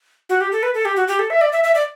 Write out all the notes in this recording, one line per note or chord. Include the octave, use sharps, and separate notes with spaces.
F#4
G4
A4
B4
A4
G4
F#4
G4
A4
E5
D5
E5
E5
D5